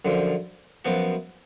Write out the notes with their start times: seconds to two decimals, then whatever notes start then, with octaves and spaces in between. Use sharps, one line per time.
0.05 F#2 D3 F3
0.85 F#2 F3 B3 F#4